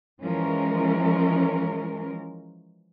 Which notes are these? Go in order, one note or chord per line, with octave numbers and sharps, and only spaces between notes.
E3 F3 G#3 C#4 A#4